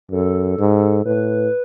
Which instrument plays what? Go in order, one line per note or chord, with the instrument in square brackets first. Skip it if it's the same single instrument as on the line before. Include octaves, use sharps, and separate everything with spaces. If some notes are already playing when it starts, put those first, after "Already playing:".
[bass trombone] F#2 [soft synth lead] A4
[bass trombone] G#2
[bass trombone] A2 [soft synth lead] B4